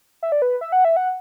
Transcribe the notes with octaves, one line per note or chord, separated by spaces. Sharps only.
E5
D5
B4
E5
F#5
E5
F#5